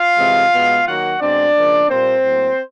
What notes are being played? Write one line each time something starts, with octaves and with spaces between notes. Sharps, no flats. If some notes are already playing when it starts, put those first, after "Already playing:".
Already playing: F4 F5
C3 E3 G#3 C4
B2 G#3 B3
D#3 F#3 A#3 F#4 F#5
B2 G#3 C4 D4 D5
C#3 F3 A#3
A#2 G3 A#3 C4 C5
A2 F#3 A#3